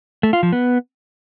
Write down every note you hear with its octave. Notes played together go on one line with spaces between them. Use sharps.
A3
F4
F3
B3